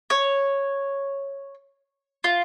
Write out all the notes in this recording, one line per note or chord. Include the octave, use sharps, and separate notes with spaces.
C#5
F4